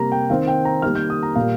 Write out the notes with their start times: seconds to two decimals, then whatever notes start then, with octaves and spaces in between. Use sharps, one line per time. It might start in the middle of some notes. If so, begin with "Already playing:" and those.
Already playing: C3 G3 A#3 A#5
0.12 G5
0.30 D#3 C4 F5
0.47 G5
0.65 A#5
0.82 D#3 G3 A#3 F6
0.95 G6
1.10 D#6
1.23 A#5
1.35 A#2 G3 A#3 F5